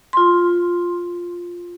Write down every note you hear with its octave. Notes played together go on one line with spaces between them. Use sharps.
F4 C6